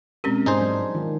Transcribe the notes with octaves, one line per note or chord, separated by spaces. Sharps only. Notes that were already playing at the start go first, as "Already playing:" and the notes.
B2 G#3 C4 C#4 G4 A#4
G#2 D4 D#4 G#4 C5
F3 F#3 D4
D#3 F4